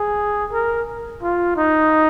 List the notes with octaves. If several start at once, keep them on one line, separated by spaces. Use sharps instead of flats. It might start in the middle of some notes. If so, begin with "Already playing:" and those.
Already playing: G#4
A#4
F4
D#4